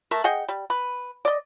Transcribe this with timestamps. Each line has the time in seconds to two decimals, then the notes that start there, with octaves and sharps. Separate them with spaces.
0.11 A3 A#4 E5
0.24 G#4 D#5 F#5 G5
0.48 G3
0.70 B4
1.25 D5 D#5